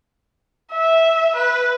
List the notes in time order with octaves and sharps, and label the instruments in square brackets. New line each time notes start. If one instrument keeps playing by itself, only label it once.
[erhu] E5
B4